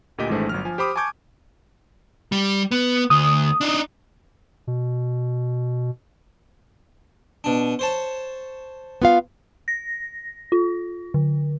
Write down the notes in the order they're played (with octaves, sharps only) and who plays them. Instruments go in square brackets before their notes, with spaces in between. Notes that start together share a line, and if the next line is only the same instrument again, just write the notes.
[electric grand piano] D2 A#2 G4 D#5 D6 B6
G#1 E3 G#3 A3 D4 C5
G1 F#3 F6
F3 G#5
G4 C5 B5 D6 D#6
G#5 A5 C#6 D6 G6 G#6
[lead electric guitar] G3
B3
[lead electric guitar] D2 [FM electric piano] D#6
[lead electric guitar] D4 D#4
[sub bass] B2
[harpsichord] B2 D4
C5 C#5 A5
[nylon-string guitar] B3 F4 F5
[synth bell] A#6
F4
D3